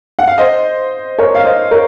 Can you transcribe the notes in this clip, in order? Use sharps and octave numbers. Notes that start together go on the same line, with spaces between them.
F#5
F5
C5 D#5
A#4 C#5
F5
C5 D#5
A#4 C#5